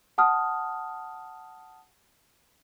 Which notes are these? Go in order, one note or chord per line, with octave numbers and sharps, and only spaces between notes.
F#5 A5 D#6 F6